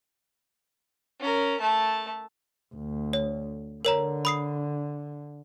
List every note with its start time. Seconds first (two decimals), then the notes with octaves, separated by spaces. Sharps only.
1.20 C#4 A#4
1.60 A3 A5
2.75 D2
3.13 C#5
3.85 D3 A#4 C#5 A#5
4.25 B5 D#6 C7